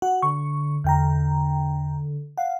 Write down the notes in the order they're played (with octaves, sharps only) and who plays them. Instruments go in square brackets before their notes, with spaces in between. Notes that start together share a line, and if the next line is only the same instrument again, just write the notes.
[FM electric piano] F#4 F#5
[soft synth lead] D3 [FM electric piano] C#6
[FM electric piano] E2 G5 A#5 [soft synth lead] D3
[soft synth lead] F5 [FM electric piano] F#5